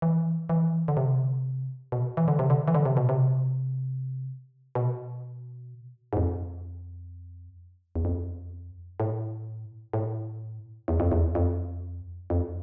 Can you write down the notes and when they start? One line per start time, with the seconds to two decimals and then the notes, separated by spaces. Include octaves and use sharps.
0.02 E3
0.49 E3
0.88 D3
0.97 C3
1.92 B2
2.17 E3
2.28 D3
2.39 C3
2.50 D3
2.68 E3
2.75 D3
2.85 C3
2.97 B2
3.09 C3
4.75 B2
6.13 G#2
6.17 F2
7.95 E2
8.05 F2
9.00 A2
9.93 A2
10.88 E2
11.00 F2
11.12 E2
11.35 F2
12.30 F2